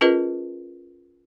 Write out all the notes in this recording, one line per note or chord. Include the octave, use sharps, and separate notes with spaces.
C#4 F4 G#4 A#4 B4 D#5